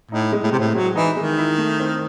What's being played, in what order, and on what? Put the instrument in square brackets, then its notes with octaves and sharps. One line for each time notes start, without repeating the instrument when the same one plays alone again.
[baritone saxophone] A2 [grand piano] D#4
[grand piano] G#3
[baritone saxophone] A2
[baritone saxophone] C3 [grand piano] C4
[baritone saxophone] A2
[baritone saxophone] F#3 [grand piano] G#3
[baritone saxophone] E3 [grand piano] D#4
[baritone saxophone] D#3 [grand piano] G#3
[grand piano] E4
A3
C4